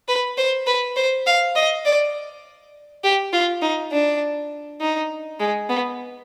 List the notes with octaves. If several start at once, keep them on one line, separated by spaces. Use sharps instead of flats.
B4
C5
B4
C5
F5
D#5
D5
G4
F4
D#4
D4
D#4
G#3
B3